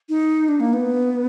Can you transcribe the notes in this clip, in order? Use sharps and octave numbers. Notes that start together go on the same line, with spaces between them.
D#4
D4
A#3
B3